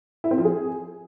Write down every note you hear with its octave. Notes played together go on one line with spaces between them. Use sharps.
E4
C4
F3
G#4